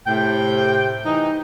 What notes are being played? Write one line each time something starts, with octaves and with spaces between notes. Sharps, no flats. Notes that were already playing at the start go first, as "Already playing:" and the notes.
A2 C3 G5
E3 D#4